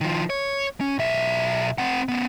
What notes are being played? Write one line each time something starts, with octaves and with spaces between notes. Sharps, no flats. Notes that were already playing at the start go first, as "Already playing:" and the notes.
D#3 F3
C#5
C#4
B1 E5
C4 F#5
B3 C#4